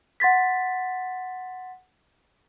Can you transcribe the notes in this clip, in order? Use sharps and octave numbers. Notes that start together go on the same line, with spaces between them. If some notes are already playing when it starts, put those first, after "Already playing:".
F#5 C6 A6 B6